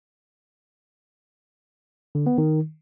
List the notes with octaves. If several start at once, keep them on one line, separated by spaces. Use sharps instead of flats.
D3
B3
D#3